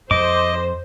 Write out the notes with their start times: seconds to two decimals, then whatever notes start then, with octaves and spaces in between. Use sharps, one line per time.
0.11 F2 C5 D#5 D6